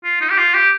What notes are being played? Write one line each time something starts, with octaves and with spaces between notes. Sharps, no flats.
F4
D#4
G4
F4
G4